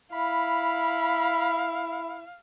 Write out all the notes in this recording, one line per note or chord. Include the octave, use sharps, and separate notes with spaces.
E4 F5 B5